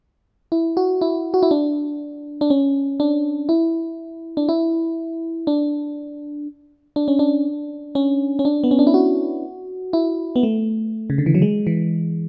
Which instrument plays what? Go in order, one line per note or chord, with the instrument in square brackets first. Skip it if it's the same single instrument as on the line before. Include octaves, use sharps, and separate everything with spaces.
[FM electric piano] E4
F#4
E4
F#4
E4
D4
D4
C#4
D4
E4
D4
E4
D4
D4
C#4
D4
C#4
C#4
D4
B3
C#4
D4
E4
F#4
E4
B3
A3
C#3
D3
E3
F#3
G#3
E3